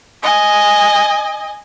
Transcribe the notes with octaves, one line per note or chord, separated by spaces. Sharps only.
D#5 G#5